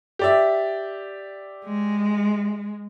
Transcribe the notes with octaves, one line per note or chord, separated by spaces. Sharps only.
G4 D5 E5
G#3